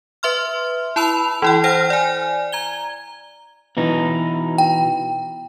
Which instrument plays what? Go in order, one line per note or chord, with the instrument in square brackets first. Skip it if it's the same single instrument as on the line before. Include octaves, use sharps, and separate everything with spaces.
[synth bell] B4 E5 C6 F6
E4 A5 B5 E6 F7
E3 E4 G5
C5 F#5 G5 F6 A#6
D5 G#5
A#5 G#6 G7
[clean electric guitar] B2 E3 D#4
[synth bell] G5